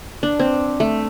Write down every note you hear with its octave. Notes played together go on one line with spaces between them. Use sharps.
D4
C4
A3